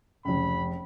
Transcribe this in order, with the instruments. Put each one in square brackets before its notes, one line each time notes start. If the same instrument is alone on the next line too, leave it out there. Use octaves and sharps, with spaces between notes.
[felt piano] F1 C#2 [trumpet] B5